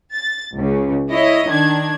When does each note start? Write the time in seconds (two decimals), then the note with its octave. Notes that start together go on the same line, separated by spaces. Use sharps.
0.14 A6
0.57 C#2 C#3
1.10 E4 C#5 D#5
1.49 D#3 D4 G#6